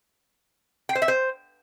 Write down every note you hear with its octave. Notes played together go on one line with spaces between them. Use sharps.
G5
C5
E5
C5